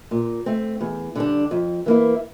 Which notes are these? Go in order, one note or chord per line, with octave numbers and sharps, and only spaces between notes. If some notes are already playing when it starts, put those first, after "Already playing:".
A#2
A3 C4
E2
D3 G3 D4
F2
E3 A#3 E4